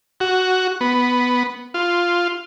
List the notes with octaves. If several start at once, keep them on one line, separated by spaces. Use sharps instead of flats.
F#4
B3
F4